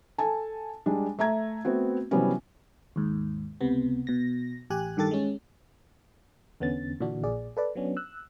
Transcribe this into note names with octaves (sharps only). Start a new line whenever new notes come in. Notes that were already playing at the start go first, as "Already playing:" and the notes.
A4 G#5 A5
G3 G#3 D4
A3 E5 A#5 G#6
A3 B3 C4 F#4
C3 E3 F#3 G3 B3 C#4
D#2 G#2
C#2 C3 B3
B2 A#6
A1 G4 G#5 F#6
G2 D#3 G4 A4 A6
G#3 C#4
E2 D3 B3 C#4 A6
A#2 D3 E3 D4 F#4
A#1 A#2 G#4 D5
A4 B4 D5
F#3 B3 C#4 D4
E6 F#6